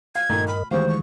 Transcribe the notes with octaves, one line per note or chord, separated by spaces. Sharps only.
F5 G#6
G2 A#2 D#3 A3 A#4 D#5
B5 F6
D2 D#3 E3 G#3 G4 C5 F5 C#6
C#6